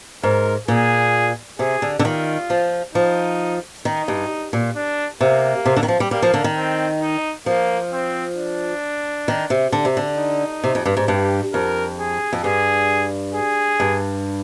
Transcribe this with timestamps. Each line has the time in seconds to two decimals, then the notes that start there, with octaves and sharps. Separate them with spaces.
0.23 G#2 A#4
0.68 A#2 G#4
1.59 C3 G#4
1.82 D3
1.99 D3
2.04 D#3 F4
2.50 F3
2.94 F3 D#4
3.85 D#3 D#4
4.08 G2
4.53 A#2
4.76 D4
5.21 C3 A#3
5.66 C3
5.76 D3
5.83 D#3
5.88 F3
6.00 G3
6.11 G3 A#3
6.22 F3
6.34 D3
6.44 D#3
6.56 C4
7.01 D#4
7.46 F3 A#3
7.92 C4
8.37 D4
9.28 D#3
9.50 C3
9.72 D3
9.85 C3
9.97 D3
10.18 D#4
10.64 C3
10.75 F2
10.86 G2
10.97 G#2
11.08 G2 G4
11.54 F2 A#4
11.99 G#4
12.33 F2
12.44 G2 G#4
13.34 G#4
13.80 G2